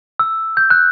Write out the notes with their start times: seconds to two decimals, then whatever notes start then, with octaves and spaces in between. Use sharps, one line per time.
0.19 E6
0.57 G6
0.70 F#6